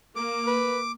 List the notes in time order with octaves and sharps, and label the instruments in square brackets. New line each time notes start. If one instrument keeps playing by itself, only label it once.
[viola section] A#3 [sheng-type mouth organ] D6
[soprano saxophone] B4